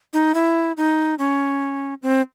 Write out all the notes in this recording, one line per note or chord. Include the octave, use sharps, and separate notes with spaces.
D#4
E4
D#4
C#4
C4